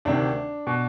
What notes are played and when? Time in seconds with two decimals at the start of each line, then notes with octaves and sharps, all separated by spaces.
0.05 D2 C3 D#3 D4
0.67 B2